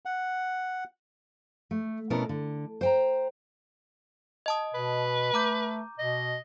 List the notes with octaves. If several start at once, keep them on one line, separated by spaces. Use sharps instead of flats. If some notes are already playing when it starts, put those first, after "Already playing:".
F#5
A3
B2 B3 C#4 E4 A4 A#4
D3
C5 G5 A#5
D#5 A5 D#6
B2 B4
A3 A#5 D6 G6
B2 D#5